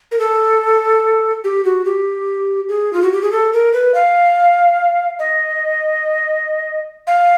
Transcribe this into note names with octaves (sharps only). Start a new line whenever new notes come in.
A#4
A4
G4
F#4
G4
G#4
F4
F#4
G4
G#4
A4
A#4
B4
F5
D#5
F5